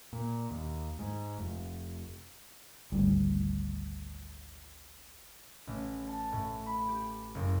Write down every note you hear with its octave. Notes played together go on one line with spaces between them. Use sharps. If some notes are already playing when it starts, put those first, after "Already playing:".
A#2
D#2
G#2
F1
G#1 D2 G3
A1
A5
A2
B5
G4
F#1